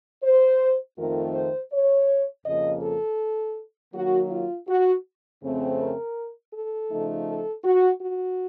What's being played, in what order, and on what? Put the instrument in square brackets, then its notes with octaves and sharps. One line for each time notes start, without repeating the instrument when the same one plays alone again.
[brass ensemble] C5
F2 D#3 A3 C4 F4 A#4
C5
C#5
F2 C#3 F3 A#3 D#5
A4
D#3 F#3 A#3 F#4
F4
F#4
F2 C#3 A3 C4
A#4
A4
C#3 F3 A3 D#4
A4
F#4
F#4